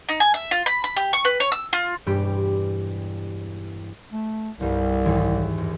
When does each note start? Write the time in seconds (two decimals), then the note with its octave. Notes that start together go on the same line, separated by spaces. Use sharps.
0.09 D#4
0.20 G#5
0.34 E5
0.51 F4
0.66 B5
0.84 B5
0.97 G4
1.13 C#6
1.25 B4
1.40 C#5
1.52 E6
1.73 F4
2.06 E1 G2 G3 G4 C6
4.12 A3
4.60 G1 C2 G3
5.05 D#2 G#2 E3
5.58 F#1